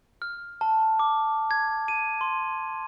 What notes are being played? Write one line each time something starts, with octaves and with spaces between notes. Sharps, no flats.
F6
A5
D6
G#6
D#7
C6